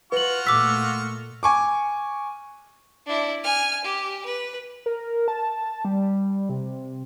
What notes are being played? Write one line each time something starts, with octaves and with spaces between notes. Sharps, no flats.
F4 F#4 B4 C#6 F#7
A#2 A3 D6 E6 B6
G#5 C#6 D6
D4 E4
G#5 F6
G4
B4
A#4
A5
G3
C3